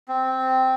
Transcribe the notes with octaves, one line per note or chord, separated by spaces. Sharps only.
C4